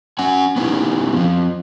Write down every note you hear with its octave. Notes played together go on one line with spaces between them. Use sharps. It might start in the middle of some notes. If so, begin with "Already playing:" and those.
C#4 F#5 G#5
B3 C#4 D#4 E4 G4
F3 C4